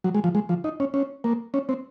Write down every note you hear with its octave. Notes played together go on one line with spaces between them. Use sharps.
F#3
G#3
F3
G#3
F3
D#4
C#4
C#4
A#3
C#4
C4